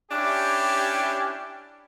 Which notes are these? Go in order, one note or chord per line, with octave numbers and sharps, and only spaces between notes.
C#4 D4 E4 G4